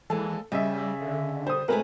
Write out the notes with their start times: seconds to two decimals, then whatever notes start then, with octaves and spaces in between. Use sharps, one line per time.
0.10 D#2 E3 G#3 A4
0.52 C#3 G3 D#5 E5
1.01 D3
1.47 G3 C5 D#6
1.68 B2 G#3 A3 C4 A#4 B4